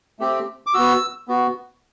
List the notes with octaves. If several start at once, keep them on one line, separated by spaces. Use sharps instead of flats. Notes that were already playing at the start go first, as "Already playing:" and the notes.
A3 C4 G4
D6
B3 F#4 E6
B3 F#4